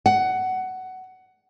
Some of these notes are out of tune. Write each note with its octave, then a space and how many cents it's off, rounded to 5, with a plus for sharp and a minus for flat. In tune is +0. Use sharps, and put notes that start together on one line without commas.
F#5 +15